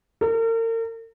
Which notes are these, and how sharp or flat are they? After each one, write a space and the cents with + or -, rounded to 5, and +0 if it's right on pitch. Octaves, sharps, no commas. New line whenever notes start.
A#4 -40